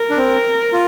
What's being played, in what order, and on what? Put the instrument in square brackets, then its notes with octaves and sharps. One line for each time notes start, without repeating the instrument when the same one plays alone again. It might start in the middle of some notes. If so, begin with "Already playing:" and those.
Already playing: [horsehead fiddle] A#4
[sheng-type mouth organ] D4
C4
F4